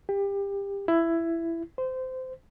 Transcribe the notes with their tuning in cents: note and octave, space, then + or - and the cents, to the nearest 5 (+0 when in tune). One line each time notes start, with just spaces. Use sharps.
G4 +25
E4 +15
C5 -20